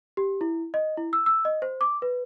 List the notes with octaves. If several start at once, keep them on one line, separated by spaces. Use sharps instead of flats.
G4
E4
D#5
E4
E6
E6
D#5
C5
D6
B4